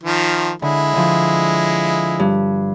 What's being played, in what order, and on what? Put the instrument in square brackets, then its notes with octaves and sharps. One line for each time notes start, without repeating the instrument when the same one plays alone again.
[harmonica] D#3 F3
[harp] D3 [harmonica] G#3 E4
[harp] D3 F3
G2